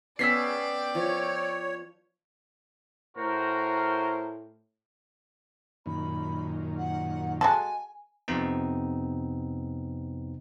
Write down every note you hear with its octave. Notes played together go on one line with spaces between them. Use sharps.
B3 C#4 G#4 D5 G5 E6 B6 C7
F3 C#5
A2 F#4 A#4 C5
F#2 A#2 D#3 B5
F#5
G#3 F#4 A4 G#5
F2 C3 B3 C4 D#4